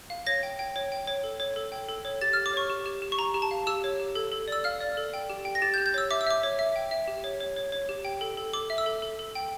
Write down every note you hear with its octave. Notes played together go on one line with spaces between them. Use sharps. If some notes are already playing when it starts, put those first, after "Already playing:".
F5
C#5 A#6
G5
G5
C#5
G5
C#5
A4
C#5
A4
G5
A4
C#5
G4 A6
F6
G4
D6
C#5 C#6
G4
G4
G4
C#6
G4 A#5
G4
A5
F5
G4 E6
C#5
G4
A4
A4
D5 E6
F5 F6
D5
A4
G5
G4
G5
A#6
G4 A6
G6
G4
G6
C#5 E6
E5 D6
E6
E5 D6
C#5
E5
G5
E5
G4
C#5
C#5
C#5
C#5
G4
G5
A4
A4
A4 D6
E5
E6
A4
A4
A4
G5